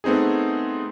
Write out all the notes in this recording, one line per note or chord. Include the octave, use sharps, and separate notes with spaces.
A3 B3 C4 D#4 G#4